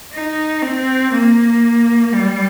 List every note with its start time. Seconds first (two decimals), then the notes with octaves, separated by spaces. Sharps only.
0.13 D#4
0.62 C4
1.12 A#3
2.13 G3